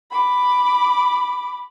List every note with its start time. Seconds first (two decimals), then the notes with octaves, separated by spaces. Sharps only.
0.11 B5 D6